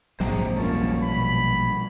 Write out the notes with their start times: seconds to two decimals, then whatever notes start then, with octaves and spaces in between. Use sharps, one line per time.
0.20 A#1 G#2 C3 F#3 G#3 C5 G5 A#5
0.57 F1 G3 A#3 C#4 F4 A5 C#6
1.02 B2 D#3 B5